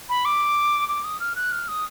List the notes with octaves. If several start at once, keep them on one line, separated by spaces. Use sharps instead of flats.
B5
D6
D6
D#6
F6
F#6
F6
D#6